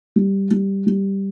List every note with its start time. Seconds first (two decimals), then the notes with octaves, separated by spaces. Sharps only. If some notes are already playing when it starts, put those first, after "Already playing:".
0.16 G3
0.51 G3
0.86 G3